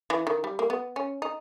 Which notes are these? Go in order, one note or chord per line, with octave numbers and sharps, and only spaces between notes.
E3
D#3
G3
A#3
B3
C#4
D#4